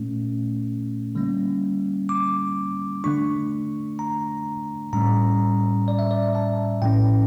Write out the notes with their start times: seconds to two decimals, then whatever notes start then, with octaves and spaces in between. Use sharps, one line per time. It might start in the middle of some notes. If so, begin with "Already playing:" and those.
Already playing: A#2 A3 C#4
1.15 D3 G3 A#3 C#4
2.09 D6
3.04 D3 A3 D4 C#6
3.99 A#5
4.93 A2 G3 C#4 A#5
5.88 D5
5.99 E5
6.11 D5
6.35 A5
6.82 A2 F3 C#4 G5